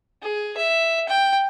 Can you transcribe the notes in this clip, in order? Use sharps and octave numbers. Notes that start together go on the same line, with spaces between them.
G#4
E5
G5